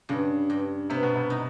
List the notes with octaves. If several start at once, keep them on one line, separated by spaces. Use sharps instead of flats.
G2 C#3
G2
C3 B3
B2
C3
D#4